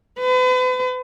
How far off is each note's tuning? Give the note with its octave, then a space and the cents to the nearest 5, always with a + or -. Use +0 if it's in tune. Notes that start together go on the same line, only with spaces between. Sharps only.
B4 +40